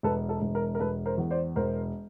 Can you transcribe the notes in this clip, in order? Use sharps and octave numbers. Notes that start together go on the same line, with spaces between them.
E1 A4 B4
A4
E1
A#4
A#4
E1 A4 B4
A#4 C5
E2
C5 D5
E1 A#4 C5